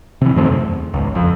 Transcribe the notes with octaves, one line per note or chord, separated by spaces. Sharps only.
C3 E3
F#2 D#3 A3 C4
E2
G#1 C#2
F2